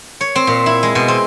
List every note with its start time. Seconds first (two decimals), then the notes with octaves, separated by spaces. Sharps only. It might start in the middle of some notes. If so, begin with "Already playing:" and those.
0.21 C#5
0.36 C4
0.47 A#2
0.66 E4
0.83 G#3
0.95 B2
1.08 C4